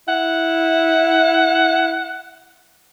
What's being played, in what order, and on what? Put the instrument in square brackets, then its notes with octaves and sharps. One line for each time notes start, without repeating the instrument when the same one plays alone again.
[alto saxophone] E4 [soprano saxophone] F#5